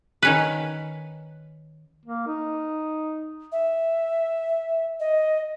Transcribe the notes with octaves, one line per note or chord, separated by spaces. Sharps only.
D#3 C#4 B4
A#3
D#4
E5
D#5